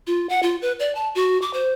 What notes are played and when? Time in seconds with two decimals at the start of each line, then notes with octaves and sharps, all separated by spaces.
0.07 F4
0.29 F#5
0.43 F4
0.62 B4
0.80 D5
0.95 A5
1.15 F#4
1.42 D6
1.53 C5